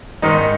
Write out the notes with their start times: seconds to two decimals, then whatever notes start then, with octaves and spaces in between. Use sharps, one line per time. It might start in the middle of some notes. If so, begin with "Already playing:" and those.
0.22 G#2 D#3 D#4